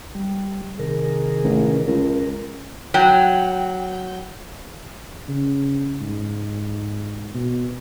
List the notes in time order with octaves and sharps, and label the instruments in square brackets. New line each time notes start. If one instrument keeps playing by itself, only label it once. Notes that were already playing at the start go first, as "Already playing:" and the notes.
[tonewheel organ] G3
[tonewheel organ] C3 D#3 A#4 [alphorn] G#4
[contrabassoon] A1
[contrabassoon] C#2 [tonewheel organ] A#4
[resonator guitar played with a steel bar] F#3 G5
[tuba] C#3
G#2
B2